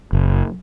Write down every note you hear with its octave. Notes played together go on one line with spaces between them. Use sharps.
F#1